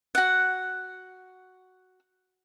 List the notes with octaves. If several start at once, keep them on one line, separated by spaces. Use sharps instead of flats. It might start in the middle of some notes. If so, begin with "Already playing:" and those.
F#4 F#5